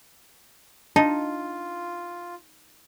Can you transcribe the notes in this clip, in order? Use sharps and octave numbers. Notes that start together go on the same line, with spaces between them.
D4 D#4 F4 A5